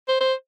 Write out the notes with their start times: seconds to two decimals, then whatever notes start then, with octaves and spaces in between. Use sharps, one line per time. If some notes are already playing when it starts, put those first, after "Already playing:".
0.08 C5
0.21 C5